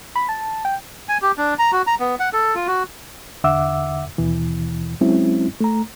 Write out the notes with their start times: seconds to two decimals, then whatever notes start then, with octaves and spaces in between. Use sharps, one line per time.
0.16 B5
0.29 A5
0.65 G5
1.09 G#5
1.22 G4
1.38 D4
1.59 A#5
1.72 F#4
1.87 A#5
2.00 B3
2.20 F#5
2.33 A4
2.55 F4
2.67 F#4
3.44 E2 D3 E5 F#5 D6 E6
4.18 D#2 B2 E3
5.01 F#3 G#3 C4 C#4 E4
5.61 A3 A#5